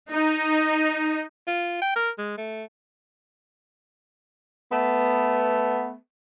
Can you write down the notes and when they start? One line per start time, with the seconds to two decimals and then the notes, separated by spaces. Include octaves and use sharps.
0.11 D#4
1.47 F4
1.81 G5
1.96 A#4
2.18 G#3
2.37 A3
4.72 A3 B3